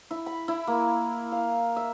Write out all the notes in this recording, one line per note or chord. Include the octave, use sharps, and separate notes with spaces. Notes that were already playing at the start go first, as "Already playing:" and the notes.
E4
B5
E4
A#3
F5
E5